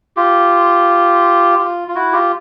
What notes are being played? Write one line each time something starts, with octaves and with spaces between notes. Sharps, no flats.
F4 G4
F4
F4
E4 F#4
F4 G4